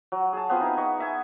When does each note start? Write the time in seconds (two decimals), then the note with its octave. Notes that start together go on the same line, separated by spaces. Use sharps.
0.12 F#3
0.33 G#4 A5
0.49 B3 C4 F4 G#4
0.61 D#4 E4 B4
0.77 B3 D#5 C#6
0.99 D#5 E5 G#5